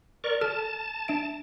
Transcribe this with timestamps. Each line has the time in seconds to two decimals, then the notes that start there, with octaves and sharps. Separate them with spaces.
0.24 A#4 D5 C#6
0.41 A4 A5 F6
1.08 D4 E5 D7